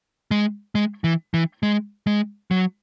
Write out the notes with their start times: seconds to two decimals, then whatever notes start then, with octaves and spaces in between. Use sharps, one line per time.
0.31 G#3
0.75 G#3
1.04 E3
1.34 E3
1.63 G#3
2.07 G#3
2.51 F#3